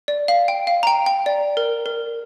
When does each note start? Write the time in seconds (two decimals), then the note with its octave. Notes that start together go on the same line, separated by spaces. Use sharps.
0.08 D5
0.28 F5
0.48 G5
0.67 F5
0.83 A#5
0.87 G5
1.06 G5
1.26 D5
1.57 A#4
1.86 A#4